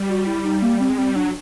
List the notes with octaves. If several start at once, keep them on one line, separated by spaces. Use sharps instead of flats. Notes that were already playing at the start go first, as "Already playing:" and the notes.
Already playing: G3
F#4
E4
D#4
A#3
C4
G#3
G3 C4
F#3 D4